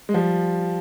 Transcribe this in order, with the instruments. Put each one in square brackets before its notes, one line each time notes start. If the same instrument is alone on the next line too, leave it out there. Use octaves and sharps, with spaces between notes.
[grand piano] G#3
F3 G3